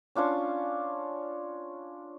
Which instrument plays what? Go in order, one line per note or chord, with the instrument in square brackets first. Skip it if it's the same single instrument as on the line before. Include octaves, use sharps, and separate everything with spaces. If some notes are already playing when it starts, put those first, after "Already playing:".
[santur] C#4 D4 F4 C#5